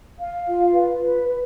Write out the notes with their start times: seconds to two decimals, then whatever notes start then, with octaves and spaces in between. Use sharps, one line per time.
0.19 F5
0.46 F4
0.73 B4
1.00 B4
1.28 B4